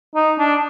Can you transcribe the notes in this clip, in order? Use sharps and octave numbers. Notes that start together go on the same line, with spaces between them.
D#4
D4